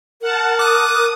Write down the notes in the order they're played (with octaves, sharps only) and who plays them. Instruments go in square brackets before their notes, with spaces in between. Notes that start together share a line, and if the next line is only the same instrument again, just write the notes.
[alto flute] A#4 [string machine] F#5 A5
[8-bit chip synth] D6 F#6 [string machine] D#6